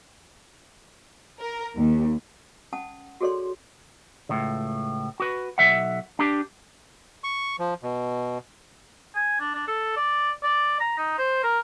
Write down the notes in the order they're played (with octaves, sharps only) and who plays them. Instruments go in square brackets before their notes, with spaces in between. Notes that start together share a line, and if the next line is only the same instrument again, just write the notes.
[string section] A#4
D#2
[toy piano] C#4 F#5 A5 D#6
F#4 G#4 A4 C#5 D5 C6
[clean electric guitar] C#2 A2 C#3
F#4 B4
B1 F#3 E5 F#5
D4 G4
[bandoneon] C#6
F3
B2
[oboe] G#5
D4
D4
A4
D5
D5
A#5
D#4
C5
A#4